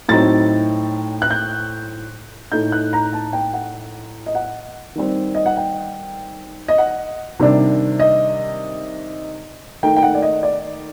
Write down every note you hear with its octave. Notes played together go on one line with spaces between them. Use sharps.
A2 F#3 C4 D#4 A6
F#6
G6
A2 A3 D#4 G6
F#6
A#5
A5
G5
F#5
D#5
F#5
D#3 G3 C4
D#5
F#5
G5
D#5
F#5
C3 D#3 G3 D4
D#5
D#3 A3 D#4 G5
G5
F#5
D5
D#5
D5